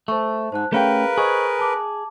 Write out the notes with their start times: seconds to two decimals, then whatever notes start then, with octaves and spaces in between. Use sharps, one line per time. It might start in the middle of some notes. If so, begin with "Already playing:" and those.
0.08 A3 C5 A5 C#6
0.52 G#2 C5 A5 F#6
0.72 A3 C#4 G#4 A#4 B4 F5 G5
1.18 G#4 C5 D#5 C#6
1.59 A5 D6